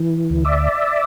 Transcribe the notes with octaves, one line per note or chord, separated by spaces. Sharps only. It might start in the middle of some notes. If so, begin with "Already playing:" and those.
Already playing: E3
D2
D5 E5